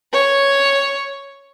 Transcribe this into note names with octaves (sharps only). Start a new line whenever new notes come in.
C#5